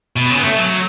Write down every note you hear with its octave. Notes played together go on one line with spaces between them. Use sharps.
B2
C#3
B3
A3
F#3